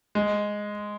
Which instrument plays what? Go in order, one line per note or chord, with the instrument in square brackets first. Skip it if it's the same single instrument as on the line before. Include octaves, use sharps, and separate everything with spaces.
[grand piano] G#3